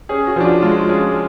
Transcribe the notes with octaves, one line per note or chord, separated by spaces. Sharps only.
C#4 G#4
F#4
F3 D4
F4
G#3 F4
C#4 G#4